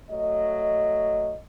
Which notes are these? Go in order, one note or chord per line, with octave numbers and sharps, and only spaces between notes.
F#3 A3 D#5